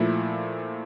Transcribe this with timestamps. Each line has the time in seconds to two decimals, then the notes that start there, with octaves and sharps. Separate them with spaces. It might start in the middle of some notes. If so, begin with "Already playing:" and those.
Already playing: A#2 F3 A3 E4